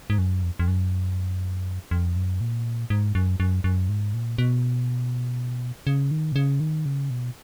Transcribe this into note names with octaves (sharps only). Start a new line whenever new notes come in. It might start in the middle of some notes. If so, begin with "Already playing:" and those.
G#2
F#2
F2
F2
F#2
F2
F#2
A#2
G#2
F#2
F#2
F#2
G#2
A#2
B2
C#3
D#3
B2
C#3
D#3
C#3
B2